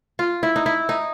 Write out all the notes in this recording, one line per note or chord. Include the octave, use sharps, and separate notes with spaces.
F4
E4
D#4
E4
D#4